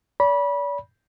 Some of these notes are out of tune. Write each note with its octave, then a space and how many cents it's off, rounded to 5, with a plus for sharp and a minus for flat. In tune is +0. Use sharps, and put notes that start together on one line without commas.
D5 -40 B5 -25